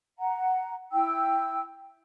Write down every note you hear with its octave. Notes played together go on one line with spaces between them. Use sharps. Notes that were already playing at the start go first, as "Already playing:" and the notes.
F#5 A#5
E4 G5 E6